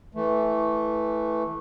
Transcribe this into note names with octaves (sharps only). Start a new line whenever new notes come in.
E3 A3